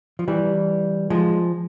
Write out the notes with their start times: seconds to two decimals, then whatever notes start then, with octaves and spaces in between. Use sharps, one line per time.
0.19 F3
0.28 E3 G3
1.10 F3 G#3